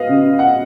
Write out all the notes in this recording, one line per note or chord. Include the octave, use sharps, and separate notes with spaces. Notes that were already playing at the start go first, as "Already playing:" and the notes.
Already playing: B4 D#5 F5
C#3
F#5